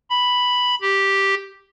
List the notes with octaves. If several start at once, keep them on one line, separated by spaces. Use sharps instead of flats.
B5
G4